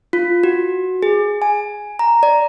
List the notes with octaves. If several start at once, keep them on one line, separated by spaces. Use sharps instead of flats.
F4
F#4
G#4
G#5
A#5
D5